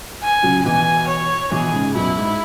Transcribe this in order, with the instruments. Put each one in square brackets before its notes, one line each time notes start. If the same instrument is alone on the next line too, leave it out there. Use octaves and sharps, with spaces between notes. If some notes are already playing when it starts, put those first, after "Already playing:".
[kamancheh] G#5
[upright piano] C#3 F#3
[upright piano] B2 E3 [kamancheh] G#5
[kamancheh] C#5
[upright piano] B2 E3 [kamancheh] G#4
[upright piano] G#2 C#3
[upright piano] F#2 B2 [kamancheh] E4
[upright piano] G#2